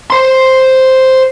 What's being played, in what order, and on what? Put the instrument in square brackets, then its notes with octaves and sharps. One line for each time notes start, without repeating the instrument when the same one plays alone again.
[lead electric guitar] C5 C6